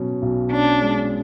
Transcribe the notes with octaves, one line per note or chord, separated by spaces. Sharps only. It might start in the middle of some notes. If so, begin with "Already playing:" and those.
Already playing: B2 F#3 C#4
B1
C#4 D4
G#3